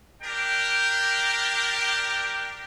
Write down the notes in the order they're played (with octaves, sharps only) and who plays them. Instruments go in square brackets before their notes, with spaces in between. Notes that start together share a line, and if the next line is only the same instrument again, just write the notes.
[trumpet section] D4 G4 A#4 G5